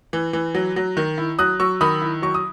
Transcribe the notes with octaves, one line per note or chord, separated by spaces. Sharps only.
E3
E3
F#3
F#3
D#3
E4
F#3 D#6 F#6
F#3 C#6 E6
D#3 B5 D#6
E4
F#3 C#6
D#6